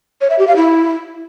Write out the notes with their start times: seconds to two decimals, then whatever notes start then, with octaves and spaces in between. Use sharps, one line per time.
0.21 C#5
0.30 E5
0.39 G4
0.47 F5
0.56 E4